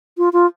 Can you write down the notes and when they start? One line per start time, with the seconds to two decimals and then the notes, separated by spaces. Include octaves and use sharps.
0.18 F4
0.33 F4